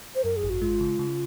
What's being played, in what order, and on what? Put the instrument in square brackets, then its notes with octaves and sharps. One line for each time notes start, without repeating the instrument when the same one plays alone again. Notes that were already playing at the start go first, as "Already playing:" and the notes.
[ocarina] C5
[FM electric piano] F#2 [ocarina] A#4
[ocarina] G#4
[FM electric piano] G#1
[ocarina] F#4
[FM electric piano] G#3 [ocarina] F4
[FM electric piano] C#3
C#3